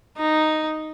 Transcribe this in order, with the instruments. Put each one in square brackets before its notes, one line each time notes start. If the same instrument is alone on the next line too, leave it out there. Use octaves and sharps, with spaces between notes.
[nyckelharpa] D#4